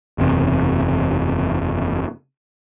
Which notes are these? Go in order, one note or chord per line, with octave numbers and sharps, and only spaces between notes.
F#1 E2 C3